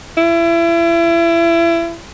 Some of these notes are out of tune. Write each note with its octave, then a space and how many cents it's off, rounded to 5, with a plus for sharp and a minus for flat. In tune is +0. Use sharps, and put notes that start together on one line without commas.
E4 +30